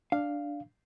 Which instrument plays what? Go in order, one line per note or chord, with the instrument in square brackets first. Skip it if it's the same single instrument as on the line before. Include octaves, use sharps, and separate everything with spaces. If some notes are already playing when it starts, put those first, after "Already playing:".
[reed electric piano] D4 [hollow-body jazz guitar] F5